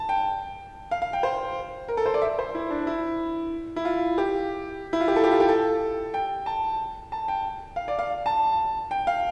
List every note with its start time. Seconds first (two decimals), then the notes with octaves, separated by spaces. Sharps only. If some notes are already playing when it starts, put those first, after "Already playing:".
Already playing: A5
0.09 G5
0.91 F5
1.02 F5
1.13 G5
1.23 C5
1.88 A#4
1.97 A4
2.06 C5
2.14 D5
2.22 E5
2.39 C5
2.55 E4
2.71 D4
2.87 E4
3.76 E4
3.85 F4
4.18 G4
4.93 E4
5.00 F4
5.08 G4
5.16 A4
5.24 G4
5.31 F4
5.40 G4
5.49 A4
6.14 G5
6.46 A5
7.12 A5
7.28 G5
7.76 F5
7.88 D5
7.99 F5
8.26 A5
8.91 G5
9.07 F5